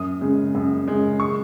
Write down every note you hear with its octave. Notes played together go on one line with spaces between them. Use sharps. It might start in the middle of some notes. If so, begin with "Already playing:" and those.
Already playing: F#2 D#6
C#3 G#3
F#2
C#3 G#3
C#6